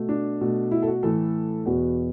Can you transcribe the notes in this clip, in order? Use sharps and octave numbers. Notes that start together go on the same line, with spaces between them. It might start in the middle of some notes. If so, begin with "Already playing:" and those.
Already playing: B2 A3
D4
B2 A3
E4
A4
F#4
A2 E3 A3 A4
E2 B2 B3 F#4